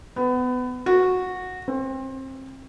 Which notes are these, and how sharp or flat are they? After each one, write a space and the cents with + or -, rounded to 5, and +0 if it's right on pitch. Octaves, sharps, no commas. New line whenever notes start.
B3 +25
F#4 -10
C4 +25